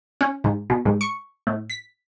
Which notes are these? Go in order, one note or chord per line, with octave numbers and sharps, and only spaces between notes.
C#4
G#2
B2
G#2
C#6
A2
B6